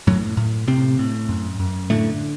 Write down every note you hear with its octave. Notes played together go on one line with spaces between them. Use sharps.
F#2 A2 F#3
A2
A2 C3 C4
A2
F#2
F#2
A2 D3 A3